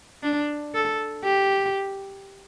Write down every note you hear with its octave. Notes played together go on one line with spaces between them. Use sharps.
D4
A4
G4